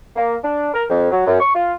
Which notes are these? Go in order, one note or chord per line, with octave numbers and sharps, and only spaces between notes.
A#3
D4
A#4
F2
F#3
F#2
C#6
F4